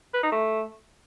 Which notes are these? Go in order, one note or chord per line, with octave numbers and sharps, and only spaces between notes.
B4
D#4
A3